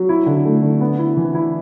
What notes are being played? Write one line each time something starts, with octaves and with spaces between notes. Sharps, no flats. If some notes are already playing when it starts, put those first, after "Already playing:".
Already playing: F#3
E4
D3
A3
D3
B3
E4
E3
E4